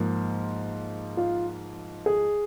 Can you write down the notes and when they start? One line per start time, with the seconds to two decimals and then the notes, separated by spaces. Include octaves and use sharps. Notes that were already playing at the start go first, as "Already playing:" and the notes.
Already playing: G#2 F3 A#3
1.17 F4
2.06 G#4